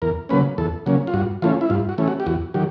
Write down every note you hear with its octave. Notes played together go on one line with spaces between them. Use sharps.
E2 A#4
C#3 F#3 A#3 C#4 B4
E2 A4
C#3 F#3 A#3 C#4
F4
G2 F#4
E3 A3 C#4 F4
E4
G2 F4
F#4
E3 A3 C#4
F#4
G4
E2 F#4
D#3 F#3 G4